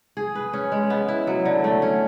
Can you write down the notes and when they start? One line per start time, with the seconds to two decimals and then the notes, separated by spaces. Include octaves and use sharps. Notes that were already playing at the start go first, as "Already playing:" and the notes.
0.17 G#4
0.35 B4
0.53 C#4
0.72 G#3
0.90 B3
1.08 E4
1.27 F#3
1.45 D3
1.64 A3
1.82 C#4